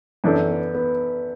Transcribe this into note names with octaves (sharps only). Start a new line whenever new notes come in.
F#2 E3 B3 D4 A4
B3
B3